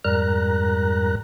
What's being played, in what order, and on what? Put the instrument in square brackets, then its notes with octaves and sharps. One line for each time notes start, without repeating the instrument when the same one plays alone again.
[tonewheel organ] F2 G#2 G3 A#4 A#5 F#6